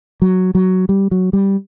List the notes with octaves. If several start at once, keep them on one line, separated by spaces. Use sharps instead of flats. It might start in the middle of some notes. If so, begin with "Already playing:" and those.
F#3
F#3
G3
F#3
G3